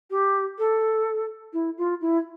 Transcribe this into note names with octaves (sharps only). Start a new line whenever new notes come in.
G4
A4
E4
F4
E4